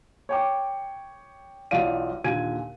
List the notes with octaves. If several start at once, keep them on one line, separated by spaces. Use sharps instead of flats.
C#5 G5 D6
B1 E3 F4 D5 F5 D#7
D#2 A#2 D3 G#5 G#6 D#7